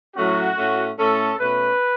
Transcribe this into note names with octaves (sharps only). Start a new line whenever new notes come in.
A2 F#3 A3 C#4 F#4
A2 A3 C#4
A2 A3 C#4 A4
B2 A3 C#4 B4